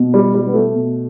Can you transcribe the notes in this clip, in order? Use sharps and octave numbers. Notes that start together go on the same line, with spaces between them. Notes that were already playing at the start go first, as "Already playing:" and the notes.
Already playing: B2
G3
G3
B3
A3
B2